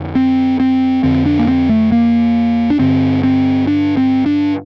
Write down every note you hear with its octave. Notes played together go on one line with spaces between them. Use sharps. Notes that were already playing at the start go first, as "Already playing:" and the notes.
Already playing: F2 D3
C4
C4
F2 D3 C4
D4
A#3
C4
A3
A#3
D4
G2 D3 C4
C4
D4
C4
D4